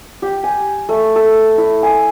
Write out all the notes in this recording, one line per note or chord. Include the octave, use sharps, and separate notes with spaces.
G4
G#5
A3
A4
E4
G#5